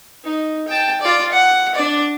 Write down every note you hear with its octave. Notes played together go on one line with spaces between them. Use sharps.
D#4
G5 A5
F4 D5
F#5
D4 D5